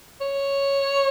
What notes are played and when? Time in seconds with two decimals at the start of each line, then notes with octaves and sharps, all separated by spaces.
0.21 C#5